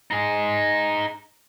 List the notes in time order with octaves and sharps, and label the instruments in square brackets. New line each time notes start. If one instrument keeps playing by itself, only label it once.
[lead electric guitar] D#4 G#4